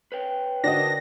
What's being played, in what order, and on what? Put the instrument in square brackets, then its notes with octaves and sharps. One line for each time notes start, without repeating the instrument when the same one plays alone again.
[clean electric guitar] B4 C#5 G5
[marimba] D3 A#4 C5 [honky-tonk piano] D4 F#4 D#5 [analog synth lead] A#6